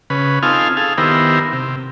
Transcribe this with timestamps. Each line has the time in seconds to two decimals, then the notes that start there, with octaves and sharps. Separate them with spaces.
0.10 C#3 B4
0.43 C4 D#4 F4 A4 F5 G#5
0.77 G#4 A4 F5
0.98 D#3 B3 E4 G4 A#4 C5
1.53 C3